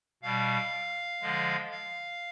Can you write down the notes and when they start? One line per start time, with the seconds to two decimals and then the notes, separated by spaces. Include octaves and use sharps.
0.23 B2 G3 F5
1.21 D3 F3 G#3
1.71 F5